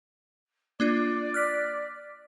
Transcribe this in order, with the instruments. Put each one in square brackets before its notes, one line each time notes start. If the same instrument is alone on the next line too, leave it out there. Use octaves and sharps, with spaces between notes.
[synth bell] A#3 D4 F4 [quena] D5
[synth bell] F6 F#6 B6